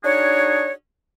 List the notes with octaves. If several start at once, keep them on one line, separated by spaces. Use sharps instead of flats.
D4 D#4 F#4 G#4 C#5